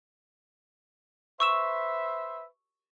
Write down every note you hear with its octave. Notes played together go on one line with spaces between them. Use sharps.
B4 C5 E5 C#6 E6 E7